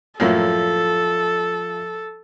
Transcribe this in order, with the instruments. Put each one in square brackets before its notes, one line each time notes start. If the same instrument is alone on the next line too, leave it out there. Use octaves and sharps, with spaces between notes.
[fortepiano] F#2 A2 A#3 [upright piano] F3 F4 E5 [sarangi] A4